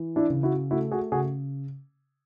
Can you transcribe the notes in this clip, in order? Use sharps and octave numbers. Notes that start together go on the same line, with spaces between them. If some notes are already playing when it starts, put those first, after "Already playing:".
Already playing: E3
D4 E4
C#3
E4 F#4
A3 E4 F#4
F#4 G#4
C#3 F#4 G#4